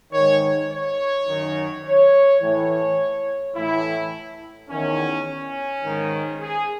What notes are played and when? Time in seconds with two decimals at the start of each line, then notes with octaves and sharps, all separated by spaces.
0.12 G#2 D#3 C#5
0.70 C#5
1.27 F#2 D#3
1.84 C#5
2.41 A2 E3 C#5
3.55 A2 E3 E4
4.69 E2 D#3 C#4
5.27 C#4
5.84 G#2 D#3
6.40 G#4